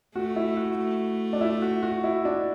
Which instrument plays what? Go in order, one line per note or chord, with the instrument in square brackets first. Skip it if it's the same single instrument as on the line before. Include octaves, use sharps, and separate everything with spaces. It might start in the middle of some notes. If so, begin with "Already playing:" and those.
[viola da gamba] A3 [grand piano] F#4
[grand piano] E4
F#4
[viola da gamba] A3
[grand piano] D4
E4
F#4
F#4
E4
D4